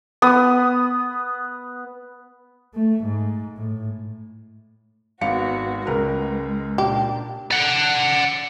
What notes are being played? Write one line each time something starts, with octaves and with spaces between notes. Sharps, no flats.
B3 D#6
A3
G#2
A2
G#1 B3 F#4 F5 C#7
C#2 G#3 A#4 B4
A#2 D4 G4
D5 F#5